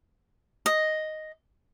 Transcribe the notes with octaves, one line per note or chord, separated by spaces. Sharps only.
D#5